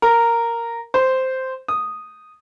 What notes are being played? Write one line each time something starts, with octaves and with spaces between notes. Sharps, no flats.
A#4
C5
D#6